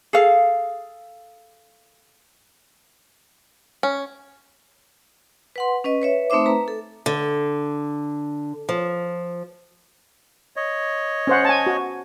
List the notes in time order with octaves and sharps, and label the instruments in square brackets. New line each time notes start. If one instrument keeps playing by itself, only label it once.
[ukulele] G#4 A4 F5
[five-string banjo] C#4
[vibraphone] B4 F#5 C6
C#4 B4 D#5
B4 C#5 E5
A3 C4 D#4 C5 E5 D6
B4 A#5
A4
[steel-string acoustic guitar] D3
F3
[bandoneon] C#5 D#5
[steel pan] C#4 C5 F#5
G#5 A5
F#4